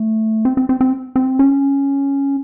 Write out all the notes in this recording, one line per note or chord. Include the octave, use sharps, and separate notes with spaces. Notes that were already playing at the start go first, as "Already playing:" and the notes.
Already playing: A3
C4
C4
C4
C4
C4
C#4